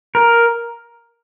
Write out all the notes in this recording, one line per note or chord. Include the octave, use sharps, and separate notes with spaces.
A#4